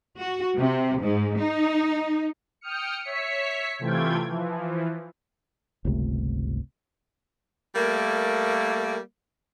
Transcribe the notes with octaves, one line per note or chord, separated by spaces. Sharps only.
F#4
C3
G#2
D#4
G5 D#6 F6 C#7
C#5 E5 B6 C#7
C3 E3 A3 F4 G5 G#6
E3 F3
G1 C#2 C3 A3
G3 A3 A#3